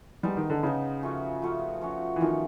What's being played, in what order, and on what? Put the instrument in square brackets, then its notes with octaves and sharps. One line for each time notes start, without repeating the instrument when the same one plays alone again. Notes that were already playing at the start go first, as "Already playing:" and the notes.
[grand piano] G3 [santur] G#3 B3 D#4
[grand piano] D#3
D3
[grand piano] C#3 [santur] G#3 B3 D#4
[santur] F3 A3 C#4 F#4
F3 A3 C#4 F#4
F3 A3 C#4 F#4
[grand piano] E3
[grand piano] D#3 [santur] F3 A3 C#4 F#4